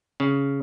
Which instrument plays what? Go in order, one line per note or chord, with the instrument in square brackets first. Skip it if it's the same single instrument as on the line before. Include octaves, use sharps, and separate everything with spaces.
[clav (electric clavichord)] C#3